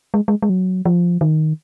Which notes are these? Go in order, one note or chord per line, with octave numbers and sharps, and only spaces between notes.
G#3
G#3
G#3
F#3
F3
D#3